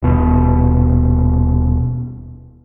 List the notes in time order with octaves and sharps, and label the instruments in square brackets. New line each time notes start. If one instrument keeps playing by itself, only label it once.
[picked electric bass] D#1 B2